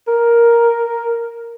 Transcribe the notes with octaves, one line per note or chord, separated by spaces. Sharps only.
A#4